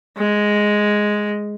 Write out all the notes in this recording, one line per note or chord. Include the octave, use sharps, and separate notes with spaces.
G#3